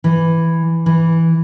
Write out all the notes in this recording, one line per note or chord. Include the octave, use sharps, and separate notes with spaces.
E3
E3